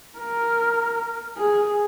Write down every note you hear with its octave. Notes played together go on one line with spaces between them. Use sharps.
A#4
G#4